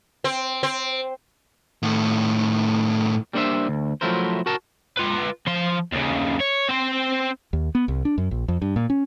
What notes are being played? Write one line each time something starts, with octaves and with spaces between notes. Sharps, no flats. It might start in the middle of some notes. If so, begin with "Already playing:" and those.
C4
C4
A2 D#3
G3 A#3 D4 E4 C5 E5
D2
F3 F#3 A3 E4 A#4 C5
F#4 A#4 A5
F4 B4
F3 C6
D#2 C#3
C#5
C4 C5
D#2
B3
C2
D4
F#2
A#1
F2
G2
A#2
C#4